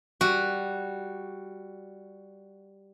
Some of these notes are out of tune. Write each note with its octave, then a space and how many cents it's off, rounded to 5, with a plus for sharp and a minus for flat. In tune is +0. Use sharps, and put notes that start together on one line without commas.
G3 +0 F#4 +0